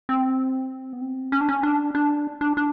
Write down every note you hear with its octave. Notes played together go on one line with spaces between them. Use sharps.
C4
B3
C4
C#4
D4
C#4
D4
D4
D4
D4